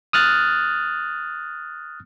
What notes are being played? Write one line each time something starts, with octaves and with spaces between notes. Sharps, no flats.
D#6 F6 F#6 A6